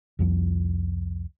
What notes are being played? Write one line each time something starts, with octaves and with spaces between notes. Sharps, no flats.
C2 F2 F3